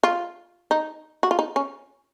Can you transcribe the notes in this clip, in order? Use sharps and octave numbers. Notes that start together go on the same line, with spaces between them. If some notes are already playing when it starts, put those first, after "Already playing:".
F4
D#4
F#4
F4
D#4
C#4